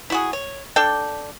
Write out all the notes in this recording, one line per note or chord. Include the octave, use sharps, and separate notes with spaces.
E4 F#4 G#4
C#5
D4 A4 D5 G5